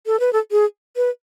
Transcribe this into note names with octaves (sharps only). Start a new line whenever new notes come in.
A4
B4
A4
G#4
B4